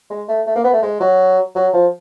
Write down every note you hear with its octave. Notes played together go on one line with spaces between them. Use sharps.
G#3
A3
A3
A#3
B3
A3
G#3
F#3
F#3
F3